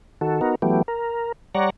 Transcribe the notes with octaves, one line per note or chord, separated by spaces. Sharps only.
D#3 F#4 A4
B3 D#4 F#4 A#4
E3 F#3 A3 B3 G4
A#4
G3 C#5 D5 F#5 A#5